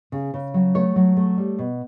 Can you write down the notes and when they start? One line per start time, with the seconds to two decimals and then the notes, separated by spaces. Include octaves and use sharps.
0.12 C#3
0.34 C#3
0.54 F#3
0.75 A3 C#5
0.96 F#3
1.17 A3
1.38 G3
1.59 B2